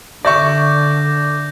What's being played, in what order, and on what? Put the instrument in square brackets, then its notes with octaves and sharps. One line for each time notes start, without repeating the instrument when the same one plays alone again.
[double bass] D3 [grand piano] D5 E5 C#6 [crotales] D6 G6 A#6